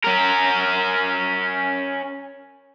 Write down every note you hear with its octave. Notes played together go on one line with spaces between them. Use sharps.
C#4 A#4